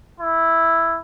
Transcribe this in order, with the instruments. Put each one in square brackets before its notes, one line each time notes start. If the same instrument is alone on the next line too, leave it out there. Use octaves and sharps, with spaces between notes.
[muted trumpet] E4